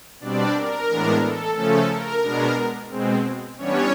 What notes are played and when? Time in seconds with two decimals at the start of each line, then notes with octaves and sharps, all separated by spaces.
0.20 B2 G3 C4 D4 D5
0.54 A#4
0.88 A2 E3 G#3 B3 D4
1.22 A4
1.55 C#3 F3 A3 C#4 A4
1.90 A#4
2.22 B2 G#3 B3 D4 A#4
2.90 B2 G#3 C4
3.58 E3 G3 B3 C#4 D4 C#5